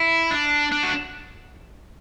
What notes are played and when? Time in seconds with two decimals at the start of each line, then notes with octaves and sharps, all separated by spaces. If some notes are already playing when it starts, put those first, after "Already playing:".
Already playing: E4
0.31 D4
0.72 D4
0.83 F#4